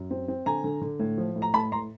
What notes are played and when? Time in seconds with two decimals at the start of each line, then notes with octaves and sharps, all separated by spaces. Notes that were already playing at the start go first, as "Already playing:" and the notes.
Already playing: F#2
0.11 C4
0.28 C4
0.46 D3 G#5 A#5
0.64 D3
0.81 D3
1.00 A2
1.18 F3
1.36 A2
1.42 A#5
1.54 A2 A5 B5
1.72 A2 A#5 C6